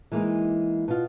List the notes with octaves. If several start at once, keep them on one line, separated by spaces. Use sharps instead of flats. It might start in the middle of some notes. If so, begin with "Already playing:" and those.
E3 G#3 A#3 D#4
B2 F4